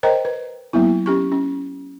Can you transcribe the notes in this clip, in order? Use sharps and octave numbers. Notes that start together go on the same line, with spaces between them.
A#4 C5 C#5 D#5 G5 A#5
B4
F#3 A#3 B3 E4
C#4 G4 C#6
C#4